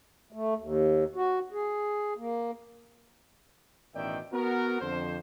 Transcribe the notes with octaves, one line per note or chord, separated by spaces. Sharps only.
A3
D#2
F#4
G#4
A#3
A1 B2 D#3 D5 E5 G5
B3 F#4 A#4
F2 D3 C5